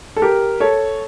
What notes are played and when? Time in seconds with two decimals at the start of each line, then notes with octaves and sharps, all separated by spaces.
0.16 A4
0.22 G4 A#4
0.60 A4 C#5